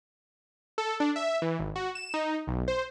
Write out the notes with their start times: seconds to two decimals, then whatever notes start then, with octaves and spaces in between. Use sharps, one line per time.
0.78 A4
1.00 D4
1.16 E5
1.42 E3
1.59 G#1
1.76 F#4
1.95 E7
2.14 D#4
2.47 B1
2.68 C5